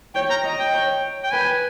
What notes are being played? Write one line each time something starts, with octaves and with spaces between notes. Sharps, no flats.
C#5 G5
A#5
D#5
G5
C#5
G5
B4 G#5